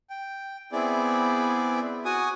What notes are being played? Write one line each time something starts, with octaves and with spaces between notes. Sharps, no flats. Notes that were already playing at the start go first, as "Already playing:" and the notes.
G5
B3 C4 E4 G#4 D5
F#4 G#5 D#6